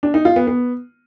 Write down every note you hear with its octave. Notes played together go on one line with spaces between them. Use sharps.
D4
D#4
F4
B3
B3